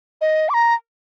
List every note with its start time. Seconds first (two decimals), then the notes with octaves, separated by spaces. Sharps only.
0.21 D#5
0.49 D6
0.54 A#5